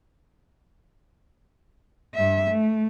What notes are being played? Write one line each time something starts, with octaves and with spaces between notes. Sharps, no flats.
G2 E5
A3